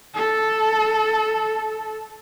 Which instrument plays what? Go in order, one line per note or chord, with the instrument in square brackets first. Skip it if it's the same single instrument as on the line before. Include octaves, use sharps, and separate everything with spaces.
[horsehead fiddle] A4